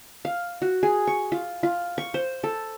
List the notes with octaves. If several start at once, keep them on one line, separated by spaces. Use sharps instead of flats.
F5
F#4
G#4
C#6
F4
F4
C#6
C5
A4